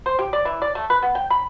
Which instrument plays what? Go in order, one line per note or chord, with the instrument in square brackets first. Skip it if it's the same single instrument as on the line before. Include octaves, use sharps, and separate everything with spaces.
[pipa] C5
G4
D5
E3
D5
A3
B4
B3
G5
B5